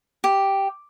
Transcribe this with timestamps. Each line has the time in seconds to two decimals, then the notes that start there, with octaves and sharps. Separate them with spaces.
0.24 G4